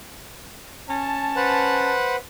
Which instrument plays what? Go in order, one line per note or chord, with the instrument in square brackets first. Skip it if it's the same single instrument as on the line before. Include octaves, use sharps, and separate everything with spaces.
[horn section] C#4 A5
[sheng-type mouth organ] B4 C5 F#5